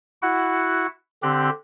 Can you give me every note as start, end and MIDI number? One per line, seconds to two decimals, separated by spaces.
0.22 0.87 64
0.22 0.87 66
0.22 0.87 78
1.23 1.50 50
1.23 1.50 60
1.23 1.50 67
1.23 1.50 90